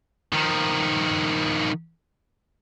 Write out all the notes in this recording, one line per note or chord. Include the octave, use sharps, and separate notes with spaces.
D#3 F3